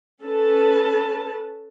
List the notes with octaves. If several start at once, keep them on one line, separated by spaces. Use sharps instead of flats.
C#4 A4 B4 A5